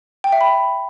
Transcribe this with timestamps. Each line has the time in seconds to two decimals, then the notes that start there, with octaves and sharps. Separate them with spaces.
0.24 G5
0.32 E5
0.41 B5